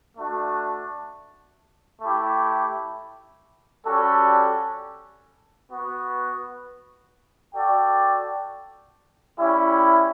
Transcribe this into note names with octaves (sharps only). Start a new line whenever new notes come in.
A3 D4 F#4
A3 E4 G4
G3 C#4 F#4 A4
B3 F#4 B4
F#4 A4 D5 G5
G3 C#4 E4